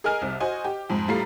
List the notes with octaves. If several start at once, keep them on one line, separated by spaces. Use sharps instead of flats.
G#4 A#4 D#5 G#5 F6
C2 C3
F#4 C5 D#5 G#5
G4
F2 G#2
A2 G3 F4 A4 A#5 C7